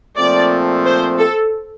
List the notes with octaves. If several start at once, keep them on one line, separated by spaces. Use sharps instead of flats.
A#2 F3 A3 C4 D5
C5
A4